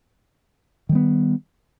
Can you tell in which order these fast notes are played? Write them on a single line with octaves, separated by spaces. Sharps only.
D#3 G3 B3